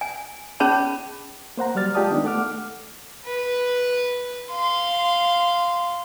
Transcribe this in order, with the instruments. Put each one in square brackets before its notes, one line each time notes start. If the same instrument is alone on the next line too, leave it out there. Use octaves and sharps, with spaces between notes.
[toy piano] G#5
C#4 G#4 C#5 A5 B5
[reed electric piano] A#3 C5 F#5 A#5
F#3 G3 D5 F6 A6
G#3 F4 G4 D5 A5 D#6
D#3 B3 D4 D#4
A3 A4 F#5 D6 F6
[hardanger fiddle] B4
F5 C6